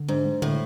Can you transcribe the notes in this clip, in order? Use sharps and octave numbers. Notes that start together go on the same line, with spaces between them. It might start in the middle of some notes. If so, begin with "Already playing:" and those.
Already playing: D3
G#2 D4
G#3
A2 D3